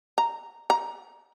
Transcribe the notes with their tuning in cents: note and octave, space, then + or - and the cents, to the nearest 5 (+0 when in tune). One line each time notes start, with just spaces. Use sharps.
A#5 -10
A#5 +10